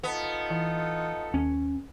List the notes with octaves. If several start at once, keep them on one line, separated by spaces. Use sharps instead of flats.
B3 D#4 F4 A4
E3
D#2 C#4